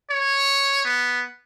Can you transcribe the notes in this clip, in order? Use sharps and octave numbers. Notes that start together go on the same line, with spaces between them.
C#5
B3